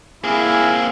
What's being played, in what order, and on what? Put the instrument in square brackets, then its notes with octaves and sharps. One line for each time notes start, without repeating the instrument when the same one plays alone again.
[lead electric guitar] A#3 C4 [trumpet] E4 [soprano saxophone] G#4